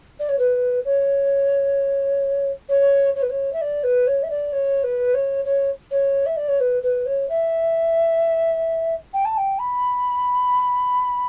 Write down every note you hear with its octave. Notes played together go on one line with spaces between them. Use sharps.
D5
C#5
B4
C#5
C#5
C#5
B4
C#5
E5
D5
B4
C#5
E5
D5
C#5
B4
C#5
C#5
C#5
E5
D5
C#5
B4
B4
C#5
E5
G5
A5
G5
B5